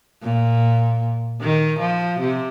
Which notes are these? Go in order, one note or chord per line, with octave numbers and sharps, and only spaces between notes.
A#2
D#3
F3
C3